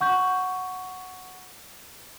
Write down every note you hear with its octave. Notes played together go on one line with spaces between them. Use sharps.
F#5 C#6 G6